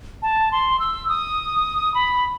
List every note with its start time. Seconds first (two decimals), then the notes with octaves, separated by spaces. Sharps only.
0.22 A5
0.52 C6
0.80 E6
1.09 D#6
1.94 B5